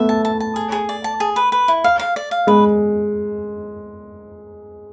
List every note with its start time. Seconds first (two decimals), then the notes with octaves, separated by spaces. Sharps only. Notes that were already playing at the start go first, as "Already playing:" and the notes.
Already playing: A3 B3 E5
0.09 A5
0.25 A5
0.40 A5
0.56 G#4
0.72 G#4
0.89 D5
1.04 A5
1.20 G#4
1.36 B4
1.52 B4
1.68 E4
1.84 F5
1.99 F5
2.16 D5
2.31 F5
2.47 G#3 B4